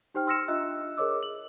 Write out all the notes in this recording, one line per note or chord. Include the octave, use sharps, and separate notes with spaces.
D#4 G4 C5 G5 F6
C6 E6 F6 A#6 C#7 E7
D4 F4 D#5 E5 E6 F#6
G#4 A#4 C#5 D#5 D6 E6
F#7